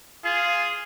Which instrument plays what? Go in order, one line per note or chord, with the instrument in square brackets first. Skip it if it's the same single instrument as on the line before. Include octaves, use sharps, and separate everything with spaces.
[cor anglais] F4 [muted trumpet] G#4